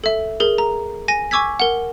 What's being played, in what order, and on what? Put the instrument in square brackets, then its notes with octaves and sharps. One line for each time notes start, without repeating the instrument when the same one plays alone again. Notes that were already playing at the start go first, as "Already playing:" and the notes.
[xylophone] A4 E5
G#4 A#4
A#5
G#5 A#6 D#7
G#5 C#6 D6 E6 G#6 B6
A#4 F#5